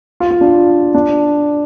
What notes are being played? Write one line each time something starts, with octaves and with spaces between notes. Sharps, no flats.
F4
F4
D4
D4